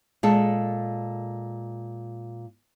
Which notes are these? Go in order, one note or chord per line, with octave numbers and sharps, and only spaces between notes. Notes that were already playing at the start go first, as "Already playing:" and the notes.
A#2 G#3 A4